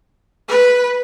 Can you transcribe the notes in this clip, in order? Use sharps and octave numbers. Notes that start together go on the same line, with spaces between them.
B4